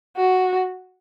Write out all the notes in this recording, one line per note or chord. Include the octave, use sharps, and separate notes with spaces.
F#4